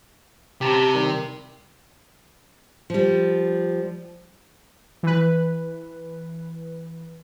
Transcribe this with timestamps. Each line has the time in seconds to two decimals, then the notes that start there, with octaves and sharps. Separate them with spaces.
0.61 C3 G4 A5 A#5
0.95 D#3 G3
2.90 F3 G3
5.03 E3 B4